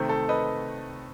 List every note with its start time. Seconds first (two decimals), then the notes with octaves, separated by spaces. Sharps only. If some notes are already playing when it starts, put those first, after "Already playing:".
Already playing: C3 D#3 A3 C4
0.09 A4
0.29 B4 D#5